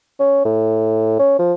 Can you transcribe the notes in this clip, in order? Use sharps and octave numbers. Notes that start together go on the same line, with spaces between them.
C#4
A2
C#4
F3